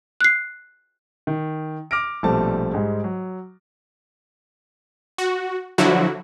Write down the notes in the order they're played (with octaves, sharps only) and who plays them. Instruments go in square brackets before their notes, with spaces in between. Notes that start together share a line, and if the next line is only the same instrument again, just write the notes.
[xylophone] F#6 C7
[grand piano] D#3
D6 F6 A#6 D7
A#1 B2 G3 A3 C4 A5
G#2 G3 G#3
F#3
[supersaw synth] F#4
D3 F3 F#3 E4 F#4